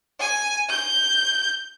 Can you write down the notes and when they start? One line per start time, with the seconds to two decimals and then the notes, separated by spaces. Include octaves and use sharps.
0.20 G#5
0.70 G6